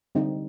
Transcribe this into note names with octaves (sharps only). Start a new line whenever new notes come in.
D3 G3 C4 D#4